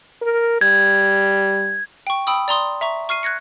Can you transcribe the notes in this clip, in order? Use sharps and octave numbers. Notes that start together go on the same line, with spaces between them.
A#4
G3 G#6
G5 C#6
G5 B5 D#6 E6
D5 A#5 C6 D#6
E5 A#5 C#6
C#6 F6 C7 D#7
F#6 G#6 A#6 C#7